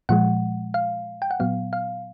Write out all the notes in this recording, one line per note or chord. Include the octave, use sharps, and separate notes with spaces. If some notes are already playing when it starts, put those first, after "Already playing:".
A#2 F3 G#3 F#5
F5
G5
F#5
A#2 F#3 B3 F5
F5